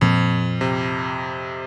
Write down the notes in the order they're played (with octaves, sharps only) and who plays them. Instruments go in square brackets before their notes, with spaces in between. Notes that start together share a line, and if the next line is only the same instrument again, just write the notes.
[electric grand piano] F2 [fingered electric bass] A#2 F3 C4
[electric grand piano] C3